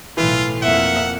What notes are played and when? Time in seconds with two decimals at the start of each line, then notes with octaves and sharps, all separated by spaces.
0.17 B1 A2 E3 F4
0.62 F2 A#3 E5 F#5